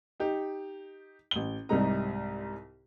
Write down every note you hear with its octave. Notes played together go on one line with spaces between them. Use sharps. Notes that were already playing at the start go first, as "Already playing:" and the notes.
D#4 G4
A1 G7
C2 G#2 C3 G3 D#4 A#5